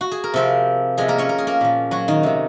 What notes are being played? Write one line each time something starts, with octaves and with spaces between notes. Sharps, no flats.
F#4
G#4
A#4
C3 F3 C4 C5
C3 F3 G#3 G#4
A#3 A#4
C#4 C#5
A#4
G#4
A#3 A#4
A#2 F3
F#3 F#4
D#3 D#4
C3 D#3